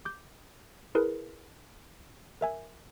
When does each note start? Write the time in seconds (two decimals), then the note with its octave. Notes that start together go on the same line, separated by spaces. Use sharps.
0.05 D6 G6
0.95 E4 G#4 A#4 B4
2.41 A#4 E5 G#5